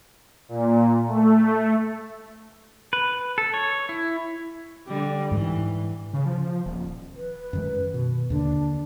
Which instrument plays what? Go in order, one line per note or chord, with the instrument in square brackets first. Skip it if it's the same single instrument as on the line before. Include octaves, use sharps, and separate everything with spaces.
[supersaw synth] A#2
A3
[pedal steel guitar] B4
A4
C#5
E4
[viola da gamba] D3 G3
[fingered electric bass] G#2 [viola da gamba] E3
[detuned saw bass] C#3
F3
D#1
[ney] B4
[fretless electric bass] F#2 D#3 G#3
B2
[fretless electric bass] D#2 D3 [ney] D4